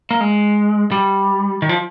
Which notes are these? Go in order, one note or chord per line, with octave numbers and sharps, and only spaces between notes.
A#3
G#3
G3
D#3
F3